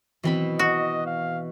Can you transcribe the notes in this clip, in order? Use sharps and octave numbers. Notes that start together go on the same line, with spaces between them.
B2 E3 C4 B5
F#4 D#5
F5